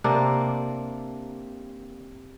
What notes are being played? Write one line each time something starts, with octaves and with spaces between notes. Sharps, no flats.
C3 A#3 D4